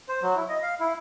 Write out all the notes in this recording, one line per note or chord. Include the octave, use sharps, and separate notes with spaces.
C5
F#3
E4
D#5
F5
E4